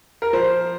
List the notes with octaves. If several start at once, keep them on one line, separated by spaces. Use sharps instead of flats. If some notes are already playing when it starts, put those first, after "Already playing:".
A#4
F3 C5